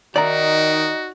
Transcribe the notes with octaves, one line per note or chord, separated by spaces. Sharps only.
D#3 D#4 F#4 D5 E5 A#5